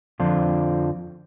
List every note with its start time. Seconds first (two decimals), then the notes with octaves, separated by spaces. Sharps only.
0.20 F2 D3 F3 C4 D4 F4